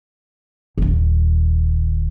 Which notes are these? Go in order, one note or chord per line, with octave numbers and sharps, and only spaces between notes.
D#1 D#2